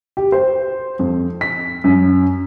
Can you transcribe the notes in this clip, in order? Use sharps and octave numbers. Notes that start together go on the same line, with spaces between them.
G4
C5
F2
B6
F#2